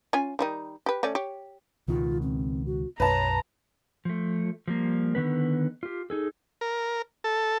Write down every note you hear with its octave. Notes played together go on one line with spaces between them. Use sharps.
C#4 F4 G#5
D#3 G3 D#4
G4 B4
A3 C#4 D5
G4 C#5
C#2 B2 D#3 F4
C4
F#4
B1 F#2 B4 C#5 A5 A#5
F3 A3
F3 G3 A#3
D3 D#3 B3 B4
F4 G4
D#4 G#4 A4
A#4
A4